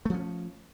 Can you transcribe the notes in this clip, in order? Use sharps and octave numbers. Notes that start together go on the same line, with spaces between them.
F3 A3 C#4